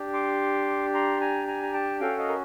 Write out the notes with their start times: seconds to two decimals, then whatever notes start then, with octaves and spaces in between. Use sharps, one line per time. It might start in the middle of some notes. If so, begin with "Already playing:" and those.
Already playing: D4 G4
0.13 C6 D6
0.94 A#5 C6
1.21 G#5 A#5
1.48 G#5 A#5
1.63 A#5
1.74 G5 A5
2.00 C#4 F#4 A4 F5 G5
2.18 D#5 F5
2.28 A#4